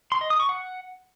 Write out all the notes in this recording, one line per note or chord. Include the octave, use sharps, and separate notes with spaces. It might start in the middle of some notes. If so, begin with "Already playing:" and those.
C6
D#5
D#6
C#6
F#5